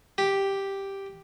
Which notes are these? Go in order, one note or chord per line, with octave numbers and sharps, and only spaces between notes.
G4